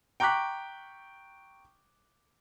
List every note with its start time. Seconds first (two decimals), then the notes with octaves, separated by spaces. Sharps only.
0.20 G5 A#5 C#6 D6 F#6 B6